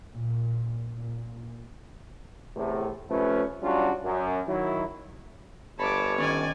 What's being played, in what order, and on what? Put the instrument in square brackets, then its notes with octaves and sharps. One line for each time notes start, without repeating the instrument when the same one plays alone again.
[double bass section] A#2
A#2
[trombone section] E2 A2 C3
C3 F3 A3 C#4 B4
F#3 G3 C#4 D4 F4 F#4
F#2
D#3 F#3 E4
[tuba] G1 [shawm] C#5 [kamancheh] A5 D6 [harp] B5
[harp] D#3 C#4 [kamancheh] D5 G#5